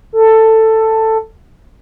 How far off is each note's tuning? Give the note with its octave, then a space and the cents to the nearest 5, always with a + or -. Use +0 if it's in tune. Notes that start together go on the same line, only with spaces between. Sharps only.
A4 +10